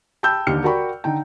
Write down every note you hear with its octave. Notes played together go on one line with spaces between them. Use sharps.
G5 A5 B5 E6 G6
D#2 D3 D#3 G4 F6 C#7
F#4 A#4 D5 G5 B5 C#6
D3 D#4 G5